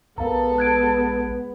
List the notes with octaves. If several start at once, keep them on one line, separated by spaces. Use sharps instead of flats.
A#1 G#3 B3 A4 A#4 F5 A5 A#5
F#6 G#6 D7